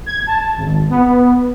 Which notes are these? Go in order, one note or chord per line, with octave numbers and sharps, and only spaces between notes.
G#6
A5
G#1
B3